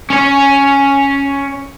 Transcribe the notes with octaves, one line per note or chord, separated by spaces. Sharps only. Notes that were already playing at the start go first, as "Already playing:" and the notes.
C#4 C#5